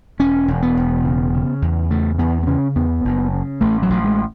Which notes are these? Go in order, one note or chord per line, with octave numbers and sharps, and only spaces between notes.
E1 C#4
E1
B3
E1
C#3
C#3
E2
C#3 A3
E2 B3
B3
C#3 C#4
E2 B3
F#1
C#3
A1 A3
F#3
A1
G#3